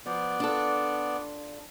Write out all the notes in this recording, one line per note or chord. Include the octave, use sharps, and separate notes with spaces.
F3 B3 D5
D4 F4 A4